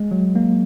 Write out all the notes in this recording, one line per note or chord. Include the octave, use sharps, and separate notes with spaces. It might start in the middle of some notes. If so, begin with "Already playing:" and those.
Already playing: G#3
F#3
A#3